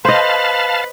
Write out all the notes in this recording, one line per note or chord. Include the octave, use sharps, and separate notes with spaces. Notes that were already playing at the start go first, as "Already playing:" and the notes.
B4 C5 D#5 F5 A5